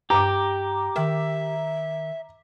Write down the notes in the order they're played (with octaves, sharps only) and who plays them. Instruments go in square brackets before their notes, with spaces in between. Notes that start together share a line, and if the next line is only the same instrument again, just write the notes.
[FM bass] G2 [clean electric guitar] G4 [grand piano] A#5 D6
[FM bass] D#3 [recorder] E5